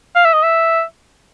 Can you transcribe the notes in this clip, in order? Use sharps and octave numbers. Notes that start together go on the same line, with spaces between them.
F5
E5
D#5
E5